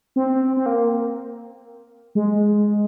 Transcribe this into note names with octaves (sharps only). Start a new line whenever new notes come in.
C4
C4
A#3
G#3